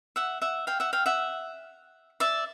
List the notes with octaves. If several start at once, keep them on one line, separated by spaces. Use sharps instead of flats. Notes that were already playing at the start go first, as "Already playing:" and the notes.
E5 F#5
E5 F#5
F5 G5
E5 F#5
F5 G5
E5 F#5
D5 E5